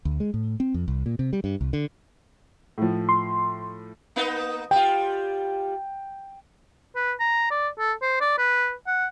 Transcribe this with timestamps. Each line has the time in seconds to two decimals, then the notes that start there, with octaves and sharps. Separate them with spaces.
0.05 D2
0.20 G#3
0.34 A2
0.60 C4
0.74 F2
0.88 C2
1.06 A#2
1.19 C3
1.33 G3
1.44 G2
1.61 C2
1.73 D3
2.78 A2 F3
3.09 C6
4.16 A#3 B3 D#4
4.71 G3 F4 G5
6.96 B4
7.20 A#5
7.51 D5
7.79 A4
8.02 C5
8.21 D5
8.38 B4
8.87 F#5